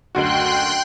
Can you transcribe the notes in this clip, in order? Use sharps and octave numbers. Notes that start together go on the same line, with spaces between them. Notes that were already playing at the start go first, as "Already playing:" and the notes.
F#1 D2 F#4 G5 C6 F#6